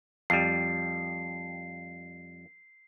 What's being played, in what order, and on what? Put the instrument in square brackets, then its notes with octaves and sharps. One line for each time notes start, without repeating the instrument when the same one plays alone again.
[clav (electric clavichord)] F2 G3 [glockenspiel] C7